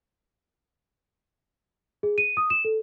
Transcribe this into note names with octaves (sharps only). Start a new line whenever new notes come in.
G#4
D#7
D#6
E7
A4